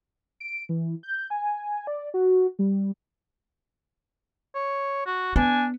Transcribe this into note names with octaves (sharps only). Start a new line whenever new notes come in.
D7
E3
G6
G#5
D5
F#4
G3
C#5
F#4
B3 D4 G#5